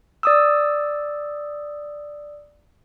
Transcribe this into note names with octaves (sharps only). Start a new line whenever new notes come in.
D5 D#6 E6